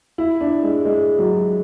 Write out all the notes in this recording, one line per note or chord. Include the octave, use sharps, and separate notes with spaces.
E4
D4
G#3
G#3
F#3